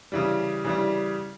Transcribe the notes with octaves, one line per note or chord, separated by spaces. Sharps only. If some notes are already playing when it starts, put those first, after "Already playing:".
C#3 E3 G3
C#3 E3 G3